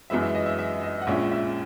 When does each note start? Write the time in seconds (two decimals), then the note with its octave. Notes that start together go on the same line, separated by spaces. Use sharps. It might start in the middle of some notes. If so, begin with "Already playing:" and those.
0.10 F#2 E3 G#3 E5
0.23 E5
0.35 D#5
0.46 E5
0.58 E5
0.83 D#5
1.02 F#5
1.07 A#1 A#2 G#3 C#4 E5
1.31 E5